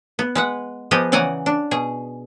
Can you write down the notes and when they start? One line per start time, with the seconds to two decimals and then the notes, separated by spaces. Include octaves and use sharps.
0.19 B3
0.35 G#3 B4 F#5
0.91 F3 B3 G4 G#4 D#5
1.12 C#3 E3 D5 F#5 G#5 A#5
1.46 D4
1.71 B2 G#4